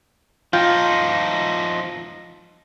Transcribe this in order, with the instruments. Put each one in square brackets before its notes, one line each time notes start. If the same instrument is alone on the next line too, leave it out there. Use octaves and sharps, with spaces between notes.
[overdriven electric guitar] F3 D#4 [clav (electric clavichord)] F4 G5